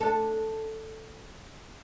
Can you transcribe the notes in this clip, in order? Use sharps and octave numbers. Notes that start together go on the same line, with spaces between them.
D4 A4